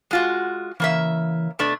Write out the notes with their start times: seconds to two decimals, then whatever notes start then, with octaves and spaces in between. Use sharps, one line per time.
0.11 G#3 F4 F#4
0.80 C#3 E3 A#3 E5
1.59 B2 A3 D4